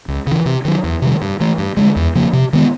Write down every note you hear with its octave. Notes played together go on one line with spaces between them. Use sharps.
C#2
C#3 E3
C3
D#3 F#3
E2
C3 D#3 G3
G2
E3 A3
G2
D3 F3 G#3
E2
C#3 F3 A#3
C3
D#3 G#3 B3